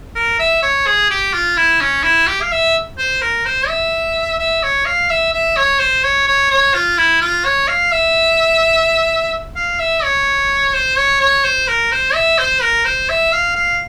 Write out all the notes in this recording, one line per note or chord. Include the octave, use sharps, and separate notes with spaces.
A#4
E5
C#5
G#4
G4
F4
E4
C#4
E4
G4
F5
E5
C5
A#4
C5
E5
E5
C#5
F5
E5
E5
C#5
C5
C#5
C#5
C#5
F4
E4
F4
C#5
F5
E5
F5
E5
C#5
C5
C#5
C#5
C5
A#4
C5
E5
C5
A#4
C5
E5
F5
F5